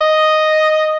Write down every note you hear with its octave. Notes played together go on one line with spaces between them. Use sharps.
D#5